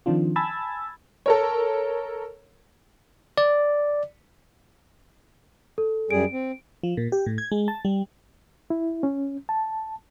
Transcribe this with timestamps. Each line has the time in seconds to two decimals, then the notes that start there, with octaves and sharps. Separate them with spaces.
0.06 D#3 F3 C4 D4 F4
0.36 G#5 A5 B5 E6 G#6 A6
1.26 A4 A#4 C#5
3.38 D5
5.78 A4
6.11 F#2 G3 G#4 D7
6.32 C4
6.83 F3
6.97 A#2
7.12 G4
7.26 A2
7.38 G#6
7.52 G#3
7.68 A5
7.85 G3
8.70 E4
9.03 C#4
9.49 A5